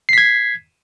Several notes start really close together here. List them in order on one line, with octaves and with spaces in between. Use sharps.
C7 B6 G#6